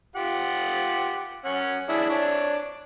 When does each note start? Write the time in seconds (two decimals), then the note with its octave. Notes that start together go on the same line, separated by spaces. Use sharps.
0.16 F4 G4 F#5
1.45 C#4 F#5
1.89 D4 E4 G#4
2.10 D4 C#5